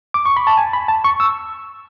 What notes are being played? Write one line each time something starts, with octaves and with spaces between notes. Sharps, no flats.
D6
C#6
B5
A5
G#5
B5
A5
C#6
E6